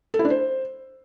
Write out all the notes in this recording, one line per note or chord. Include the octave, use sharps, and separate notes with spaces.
A4
E4
D4
C5